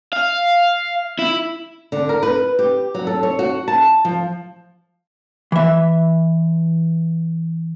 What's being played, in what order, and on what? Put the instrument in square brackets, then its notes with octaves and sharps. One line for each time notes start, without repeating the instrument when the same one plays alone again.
[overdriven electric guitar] F5
E4
[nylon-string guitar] D3
A#4
B4
G4
F#3
A4
C#5
F#4
A5
F3
[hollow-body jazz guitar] E3 E5